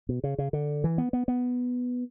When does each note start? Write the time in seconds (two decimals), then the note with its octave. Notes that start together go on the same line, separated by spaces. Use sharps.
0.09 B2
0.24 C#3
0.38 C#3
0.53 D3
0.84 E3
0.98 B3
1.13 B3
1.28 B3